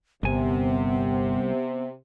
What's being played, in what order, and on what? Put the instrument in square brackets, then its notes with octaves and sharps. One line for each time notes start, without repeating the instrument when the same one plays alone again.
[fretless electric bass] G1 [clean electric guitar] C2 G#5 [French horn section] C3 [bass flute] B3